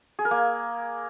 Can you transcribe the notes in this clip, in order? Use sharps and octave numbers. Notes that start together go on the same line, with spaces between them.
G#4
A#4
A#3